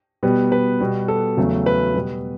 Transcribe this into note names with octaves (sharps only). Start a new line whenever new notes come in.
B2 G3 B3
B4
B2 G3 B3
A4
E2 C#3 F#3 A3
B4
B2 G3 B3